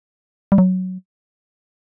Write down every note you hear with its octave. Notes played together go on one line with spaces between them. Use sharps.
G3
F#3